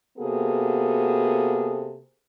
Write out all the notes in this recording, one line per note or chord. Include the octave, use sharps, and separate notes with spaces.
C3 A#3 B3 F#4 G#4 A4